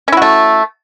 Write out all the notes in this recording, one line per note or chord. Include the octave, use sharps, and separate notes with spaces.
A3 C#4 E4 F#4